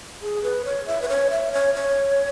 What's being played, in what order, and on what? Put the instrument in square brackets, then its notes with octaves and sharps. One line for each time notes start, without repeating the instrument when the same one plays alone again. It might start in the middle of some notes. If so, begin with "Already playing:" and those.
[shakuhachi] G#4
B4
C#5
E5
B4
C#5
E5
C#5
C#5